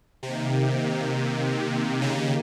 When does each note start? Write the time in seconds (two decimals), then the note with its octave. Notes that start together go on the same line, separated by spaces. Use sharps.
0.23 C3 D#3 A#3 D#4 G4
2.02 C#3